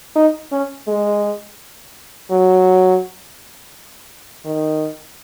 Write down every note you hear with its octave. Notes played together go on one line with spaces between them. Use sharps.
D#4
C#4
G#3
F#3
D#3